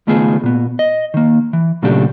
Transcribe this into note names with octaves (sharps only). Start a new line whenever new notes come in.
C#2 D#3 A3 B3 F4 G#4
A#2 B3
D#5
D#3 A#3
E3
A#2 C#3 F#3 A3 D4 G4